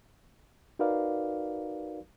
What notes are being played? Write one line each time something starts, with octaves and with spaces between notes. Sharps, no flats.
D#4 F#4 A#4 B4 D5 F5